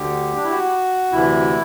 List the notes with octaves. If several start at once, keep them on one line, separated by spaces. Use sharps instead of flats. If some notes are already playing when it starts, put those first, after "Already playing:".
Already playing: D2 D3 G4
D4
E4
F#4
D2 C3 E3 E4